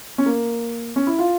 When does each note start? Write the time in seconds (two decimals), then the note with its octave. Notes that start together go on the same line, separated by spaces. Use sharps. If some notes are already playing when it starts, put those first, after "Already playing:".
0.18 C#4
0.26 A#3
0.96 C#4
1.07 E4
1.18 F4